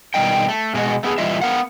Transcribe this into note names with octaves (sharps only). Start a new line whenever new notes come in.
B2 D#3 G3 D#5 G5
A3
B2 G#3 F#4
A3 B3 G#4
E3 G3 F4 D#5 E5
B3 A#4 F5 F#5